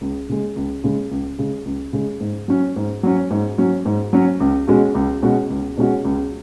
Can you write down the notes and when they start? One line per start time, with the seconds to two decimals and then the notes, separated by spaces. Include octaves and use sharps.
0.01 C#2
0.29 C#3 G#3
0.56 C#2
0.84 C#3 G#3
1.11 C#2
1.38 C#3 G#3
1.65 C#2
1.93 C#3 G#3
2.20 G#2
2.48 F#3 C#4
2.76 G#2
3.03 F#3 C#4
3.31 G#2
3.58 F#3 C#4
3.85 G#2
4.13 F#3 C#4
4.40 C#2
4.68 B2 G#3 C#4 F#4
4.95 C#2
5.22 B2 G#3 C#4 F#4
5.50 C#2
5.77 B2 G#3 C#4 F#4
6.05 C#2